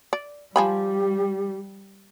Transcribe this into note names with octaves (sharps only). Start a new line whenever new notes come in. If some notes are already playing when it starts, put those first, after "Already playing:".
D5
F3 G3 G4 G#5 B5